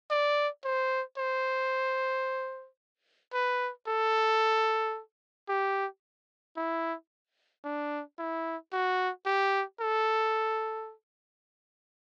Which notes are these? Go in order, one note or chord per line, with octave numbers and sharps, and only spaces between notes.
D5
C5
C5
B4
A4
G4
E4
D4
E4
F#4
G4
A4